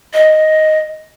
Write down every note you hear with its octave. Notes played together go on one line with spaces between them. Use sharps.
D#5